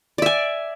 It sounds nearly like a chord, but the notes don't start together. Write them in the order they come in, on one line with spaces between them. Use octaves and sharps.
D5 E5 G#5